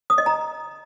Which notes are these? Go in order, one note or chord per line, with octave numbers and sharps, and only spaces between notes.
D#6
D#5
A#5